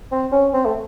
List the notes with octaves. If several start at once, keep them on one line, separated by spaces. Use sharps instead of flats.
C4
C#4
C4
A3